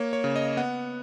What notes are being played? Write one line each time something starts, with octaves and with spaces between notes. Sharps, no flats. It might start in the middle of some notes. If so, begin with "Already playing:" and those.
Already playing: A#3 C#5
C#5
C#3
D#5
B3 F#5